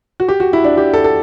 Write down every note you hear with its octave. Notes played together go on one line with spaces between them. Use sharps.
F#4
G4
F#4
E4
D4
G4
A4
A4